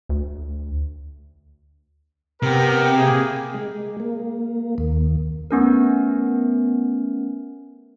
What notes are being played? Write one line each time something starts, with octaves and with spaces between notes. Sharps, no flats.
D2
C3 B3 G4 A#4
A#3 G4 G#4
G#3
A#3
D#2
A3 B3 C#4 A#4